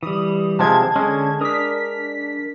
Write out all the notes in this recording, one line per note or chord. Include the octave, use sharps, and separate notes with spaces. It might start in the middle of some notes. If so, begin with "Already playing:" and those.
E3 G3 D#6
C3 F3 G#3 A5 G#6
D3 G#3 C#4
D4 A#4 D#6 B6